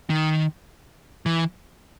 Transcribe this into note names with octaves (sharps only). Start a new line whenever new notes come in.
D#3
E3